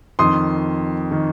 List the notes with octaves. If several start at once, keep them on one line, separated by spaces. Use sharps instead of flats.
F2 D#3 C6 D#6
D#3